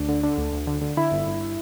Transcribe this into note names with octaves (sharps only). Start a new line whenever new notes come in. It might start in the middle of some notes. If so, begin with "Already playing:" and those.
Already playing: D2 D4
D3
D3
D2
D2
D3
D3
D3 E4
G1
G1